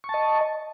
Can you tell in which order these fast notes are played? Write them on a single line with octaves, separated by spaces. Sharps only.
C#6 A5 D#5